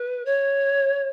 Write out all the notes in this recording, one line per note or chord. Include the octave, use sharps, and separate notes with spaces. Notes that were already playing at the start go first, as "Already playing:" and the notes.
Already playing: B4
C#5